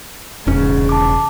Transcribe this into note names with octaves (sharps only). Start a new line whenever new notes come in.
E1 A#1 G#2 C#3 C#4
A5 D6